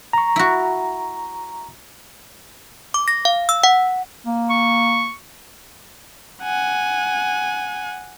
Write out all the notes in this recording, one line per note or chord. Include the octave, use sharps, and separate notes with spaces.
A#5 C#6
E4 F#4
D6
A#6
F5
E6
F#5
A#3
C#6
F#5 G#5